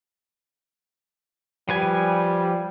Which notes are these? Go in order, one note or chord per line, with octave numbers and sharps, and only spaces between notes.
F3 G3 B4 G#5